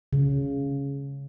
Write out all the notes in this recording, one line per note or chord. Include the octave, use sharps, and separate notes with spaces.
C#3